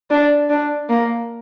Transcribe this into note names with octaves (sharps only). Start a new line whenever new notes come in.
D4
D4
A#3